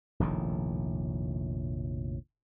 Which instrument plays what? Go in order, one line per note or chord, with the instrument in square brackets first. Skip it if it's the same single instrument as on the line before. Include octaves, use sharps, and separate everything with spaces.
[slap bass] F1 A#1 A2 D#3